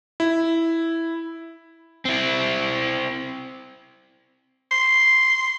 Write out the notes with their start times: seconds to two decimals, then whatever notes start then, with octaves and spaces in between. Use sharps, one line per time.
0.20 E4
2.05 C4 E4
4.71 C6